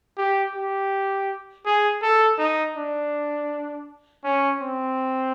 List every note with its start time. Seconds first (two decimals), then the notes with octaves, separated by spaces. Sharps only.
0.17 G4
0.55 G4
1.66 G#4
2.02 A4
2.38 D#4
2.76 D4
4.24 C#4
4.61 C4